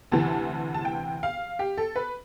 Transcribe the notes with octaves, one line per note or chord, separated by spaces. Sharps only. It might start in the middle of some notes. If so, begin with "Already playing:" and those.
D2 C3 E3 A5
A5
G5
F5
G4
A4
B4